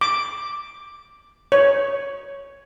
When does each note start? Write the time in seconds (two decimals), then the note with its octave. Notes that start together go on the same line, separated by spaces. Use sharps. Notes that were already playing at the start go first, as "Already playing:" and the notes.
0.01 D6
1.52 C#5